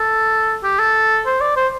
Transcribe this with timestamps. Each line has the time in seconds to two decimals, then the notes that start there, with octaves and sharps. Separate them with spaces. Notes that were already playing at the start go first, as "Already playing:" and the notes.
Already playing: A4
0.64 G4
0.79 A4
1.26 C5
1.41 D5
1.56 C5